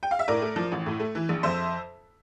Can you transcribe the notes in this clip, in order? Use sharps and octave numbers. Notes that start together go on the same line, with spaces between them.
G5
F5
E5
A2 A#4 D5
A3
F3
A1
A2
A3
E3
A#1
F2 C5 E5